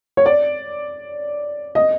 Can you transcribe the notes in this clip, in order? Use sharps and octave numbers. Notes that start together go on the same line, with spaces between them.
C#5
D5
D#5